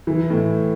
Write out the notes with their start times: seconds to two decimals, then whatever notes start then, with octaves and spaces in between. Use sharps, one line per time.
0.07 E3
0.30 A2